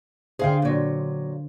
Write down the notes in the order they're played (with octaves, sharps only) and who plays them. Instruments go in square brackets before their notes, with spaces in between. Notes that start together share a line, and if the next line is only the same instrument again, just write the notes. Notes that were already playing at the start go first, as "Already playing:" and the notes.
[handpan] D3 C5 [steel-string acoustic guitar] G#4 F5 G5
[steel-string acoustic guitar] A#2 F#3